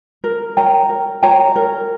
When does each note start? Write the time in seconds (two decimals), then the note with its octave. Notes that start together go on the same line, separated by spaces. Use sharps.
0.24 A#4
0.57 C#5 G5 A#5
0.89 A#4
1.23 C#5 G5 A#5
1.56 A#4